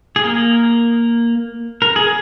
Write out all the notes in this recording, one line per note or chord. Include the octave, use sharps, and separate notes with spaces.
G#4
A#3 A#4
A#4
G#4